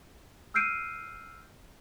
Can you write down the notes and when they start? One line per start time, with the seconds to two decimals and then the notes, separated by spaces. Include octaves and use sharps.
0.54 E6 F6 G6 C7 D7 D#7